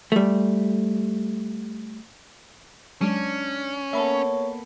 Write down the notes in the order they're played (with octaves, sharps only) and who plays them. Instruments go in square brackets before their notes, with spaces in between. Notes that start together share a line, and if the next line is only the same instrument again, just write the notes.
[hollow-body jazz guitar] G3 A3
[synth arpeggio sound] F#3 G#3 [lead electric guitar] C#4 [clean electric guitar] D4
[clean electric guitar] A#3 B3 A4 [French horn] C#5 [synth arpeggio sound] E5 B5